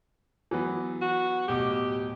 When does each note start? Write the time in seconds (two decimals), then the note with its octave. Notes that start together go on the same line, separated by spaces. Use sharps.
0.51 E3 F#3 B3
1.01 F#4
1.48 D1 B2 G4 D6